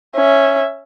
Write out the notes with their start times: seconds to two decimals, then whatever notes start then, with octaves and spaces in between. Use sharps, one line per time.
0.15 C#4 E5